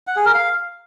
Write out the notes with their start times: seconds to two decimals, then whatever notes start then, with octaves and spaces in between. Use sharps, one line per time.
0.07 F#5
0.16 G#4
0.25 A#4
0.34 F5